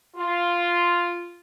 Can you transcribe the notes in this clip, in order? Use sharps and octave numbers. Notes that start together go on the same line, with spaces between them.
F4